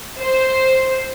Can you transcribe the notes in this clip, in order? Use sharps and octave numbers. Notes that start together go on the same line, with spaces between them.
C5